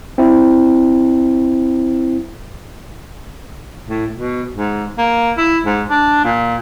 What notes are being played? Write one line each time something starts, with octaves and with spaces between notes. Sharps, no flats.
C4 E4
A2
B2
G#2
A#3
E4
G#2
D4
A#2